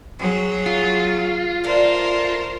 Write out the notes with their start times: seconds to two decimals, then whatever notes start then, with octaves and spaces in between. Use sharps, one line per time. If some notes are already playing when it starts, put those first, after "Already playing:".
0.19 F#3 C4 G#4
0.66 A#3 F4
1.64 A3 D4 A#4 C5